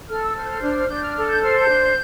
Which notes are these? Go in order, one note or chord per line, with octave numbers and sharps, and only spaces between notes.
A4 F6
E6
C5 F6
G6
F6
D4 F6
F6
D4 G6
F6
A4 F6
G6
C5 F6
G6
D4